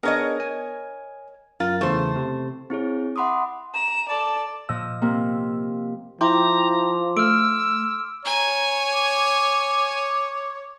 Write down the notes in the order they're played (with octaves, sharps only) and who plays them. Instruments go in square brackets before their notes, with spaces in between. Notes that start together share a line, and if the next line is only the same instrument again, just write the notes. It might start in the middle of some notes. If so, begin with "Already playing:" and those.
[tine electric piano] B3 D4 G#4 [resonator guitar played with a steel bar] A#4 C#5 D#5
[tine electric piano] G#5
[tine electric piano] F#2 A#4 A6 [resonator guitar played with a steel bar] F4
[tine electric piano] E2 C#3 E3 [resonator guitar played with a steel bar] A3 C5
[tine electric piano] C3
[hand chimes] C4 E4 G#4 C#5
E5 F#5 B5 C6 D6 D#6
[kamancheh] A#5 [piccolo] E7
[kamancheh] A4 D5 [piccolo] A5
[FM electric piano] A#2 E6 [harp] F3 D#5
[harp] C3 A#3
[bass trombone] F3 [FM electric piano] E4 G5 [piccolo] A#5 [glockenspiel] C6 D6
[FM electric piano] A3 [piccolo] E6 [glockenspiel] F6 D7
[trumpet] C#5 [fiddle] G#5 [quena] A#5
[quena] D6